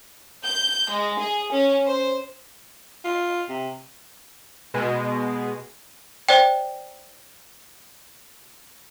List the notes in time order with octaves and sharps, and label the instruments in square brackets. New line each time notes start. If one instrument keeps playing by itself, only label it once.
[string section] G6
G#3
G#4
C#4
C5
[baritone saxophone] F4
C3
[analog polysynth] B2 G#3
[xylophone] C5 D5 G5